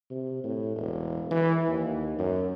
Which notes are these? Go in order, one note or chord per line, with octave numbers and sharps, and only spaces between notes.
C3
A2
E1
E3
D#2
F#2